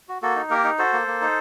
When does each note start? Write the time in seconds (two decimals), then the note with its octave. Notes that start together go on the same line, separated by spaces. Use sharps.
0.09 F#4
0.22 A#3 F#4 A4
0.36 D#4
0.50 A#3 G4 A#4
0.64 D#4
0.79 F#4 A4 C5
0.93 A#3
1.07 A#3
1.22 D#4